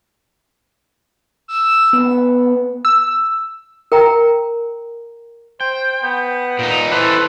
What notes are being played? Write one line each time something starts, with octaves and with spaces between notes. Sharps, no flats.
E6
B3
E6
A#4 G5 A#5
C5 G5
B3
A#2 D#4
E3 A3 A4 B4 C5